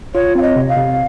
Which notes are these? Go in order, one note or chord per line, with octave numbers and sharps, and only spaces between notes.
F4 C#5
C4 F5
D#5
C3
F5
C3